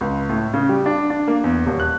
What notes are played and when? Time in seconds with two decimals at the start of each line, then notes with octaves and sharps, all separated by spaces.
0.01 C#2
0.29 A2
0.54 C#3
0.69 G3
0.86 D4
1.10 D4
1.28 A#3
1.44 E2
1.66 D#1
1.80 F#6